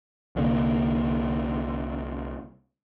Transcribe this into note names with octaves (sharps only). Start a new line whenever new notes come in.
C2 D3 G#3 A#3